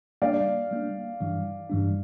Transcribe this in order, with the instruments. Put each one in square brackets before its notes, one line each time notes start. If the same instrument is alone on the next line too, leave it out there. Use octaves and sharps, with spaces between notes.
[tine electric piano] G3 A#3 D4 [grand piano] D5 F5
[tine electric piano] G3 A#3 D4
G2 E3 G3 D4
G2 E3 G3 D4